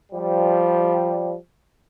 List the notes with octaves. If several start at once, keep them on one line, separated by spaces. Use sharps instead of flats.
F3 G3